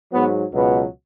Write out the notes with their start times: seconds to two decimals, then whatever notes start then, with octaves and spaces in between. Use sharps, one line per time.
0.12 G#2 F#3 B3
0.53 C#2 B2 F#3 B3